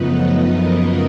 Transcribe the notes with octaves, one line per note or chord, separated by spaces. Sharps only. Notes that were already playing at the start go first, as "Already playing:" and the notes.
Already playing: F#2 C#3 F3 A3 B3 D#4 B4 D#5
A#3 A#4